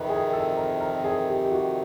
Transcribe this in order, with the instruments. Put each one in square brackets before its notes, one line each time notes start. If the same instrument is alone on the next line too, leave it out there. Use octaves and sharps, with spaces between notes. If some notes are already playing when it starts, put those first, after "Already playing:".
Already playing: [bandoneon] F2 C3 D#3 [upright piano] A#4 B4
[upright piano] G#4
A4
A#4
A#4
G#4
G4
G4
F#4